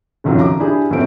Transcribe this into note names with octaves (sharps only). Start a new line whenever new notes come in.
G#1 C#2 F#2 D#3 F3 F#3
A#5 D6
D4 E4 G4 G#4
D#1 F#2 B2 A3 C4 D7